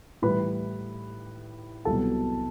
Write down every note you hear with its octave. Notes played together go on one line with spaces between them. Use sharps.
A2 E3 G3 B4 B5
C2 B2 F#3 A4 A5